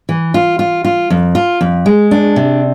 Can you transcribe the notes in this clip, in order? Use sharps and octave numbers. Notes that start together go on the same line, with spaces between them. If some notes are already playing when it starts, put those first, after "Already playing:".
E3
F4
F4
F4
F2
F4
F2
G#3
D4
C3